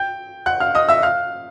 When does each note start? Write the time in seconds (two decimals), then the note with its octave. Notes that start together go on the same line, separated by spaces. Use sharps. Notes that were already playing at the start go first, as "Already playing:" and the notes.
Already playing: G5 G6
0.46 F#5 F#6
0.60 F5 F6
0.75 D#5 D#6
0.89 E5 E6
1.02 F5 F6